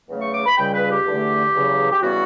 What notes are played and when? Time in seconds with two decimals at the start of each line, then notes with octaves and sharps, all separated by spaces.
0.09 E2 C#3 F#3 A3
0.21 C#6
0.33 D6
0.46 B5
0.58 C#2 C#3 G3 G5
0.73 B4
0.90 G4
1.06 E2 D3 A3
1.54 E2 C#3 F#3
1.91 G4
2.02 C#3 E3 G3 B3 F#4